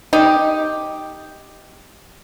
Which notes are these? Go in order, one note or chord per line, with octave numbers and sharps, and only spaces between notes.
D#4 G4